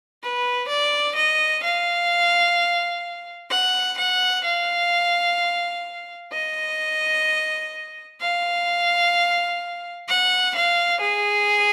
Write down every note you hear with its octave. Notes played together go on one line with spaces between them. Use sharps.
B4
D5
D#5
F5
F#5
F#5
F5
D#5
F5
F#5
F5
G#4